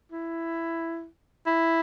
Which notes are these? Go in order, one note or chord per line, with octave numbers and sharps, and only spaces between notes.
E4
E4